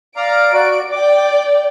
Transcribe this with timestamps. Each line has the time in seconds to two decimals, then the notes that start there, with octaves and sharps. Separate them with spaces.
0.16 D5 F5 A#5 D7
0.53 F#4 D5
0.92 D5 G5 D6